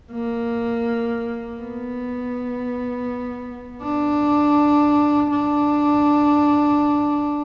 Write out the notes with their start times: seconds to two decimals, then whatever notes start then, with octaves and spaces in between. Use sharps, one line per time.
0.12 A#3
1.61 B3
3.83 D4
5.31 D4